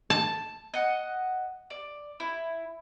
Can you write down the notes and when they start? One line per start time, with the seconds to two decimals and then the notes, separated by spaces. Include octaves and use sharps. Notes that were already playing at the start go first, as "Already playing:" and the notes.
0.10 A5
0.74 D#5 F#5
1.70 D5
2.20 E4